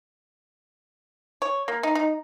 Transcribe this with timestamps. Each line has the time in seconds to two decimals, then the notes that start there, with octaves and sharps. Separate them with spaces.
1.42 C#5
1.68 A#3
1.83 D#4
1.95 D#4